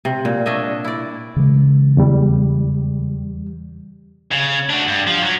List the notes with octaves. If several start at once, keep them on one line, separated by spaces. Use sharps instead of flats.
C3
A#2
D4 C#5 D#5 E5
E4 D5
C#3 E3 G#3
E2 G3
C#3
D4 F#4
G2
F3
F#3